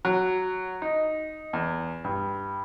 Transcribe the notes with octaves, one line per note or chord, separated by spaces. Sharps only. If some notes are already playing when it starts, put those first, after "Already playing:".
F#3
D#4
E2
G2